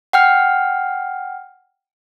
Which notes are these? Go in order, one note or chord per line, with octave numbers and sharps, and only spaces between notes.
F#5 G5 F6